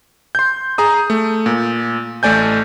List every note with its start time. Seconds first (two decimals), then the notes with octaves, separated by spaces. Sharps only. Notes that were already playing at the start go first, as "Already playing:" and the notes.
0.35 C6 G6
0.78 G#4 A#5 D#6
1.10 A3
1.46 A#2
2.23 A1 A3 D5 G#5 G6